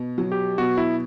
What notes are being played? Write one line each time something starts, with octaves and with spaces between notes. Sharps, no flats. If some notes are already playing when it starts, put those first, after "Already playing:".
Already playing: B2
F#3
G4
B2 F#4
E4